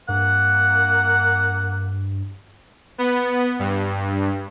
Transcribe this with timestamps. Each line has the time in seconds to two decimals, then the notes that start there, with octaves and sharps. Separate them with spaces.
0.08 G2 A#3 F#5
2.98 B3
3.59 G2